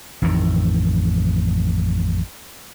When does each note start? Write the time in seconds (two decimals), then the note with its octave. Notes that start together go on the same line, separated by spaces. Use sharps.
0.22 A1 F2 A2 D#3